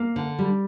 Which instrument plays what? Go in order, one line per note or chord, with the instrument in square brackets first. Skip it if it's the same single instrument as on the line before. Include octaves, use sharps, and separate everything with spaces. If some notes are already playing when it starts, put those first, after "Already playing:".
Already playing: [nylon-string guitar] A#3
D3
G3